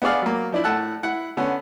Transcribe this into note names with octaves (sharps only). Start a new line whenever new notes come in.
B3 D4 G#4 D5 F5
F#3 A#3
F3 D4 E4
A2 A3 F#5 A5 E6 F#6
E4 F#5
D3 B3 C#4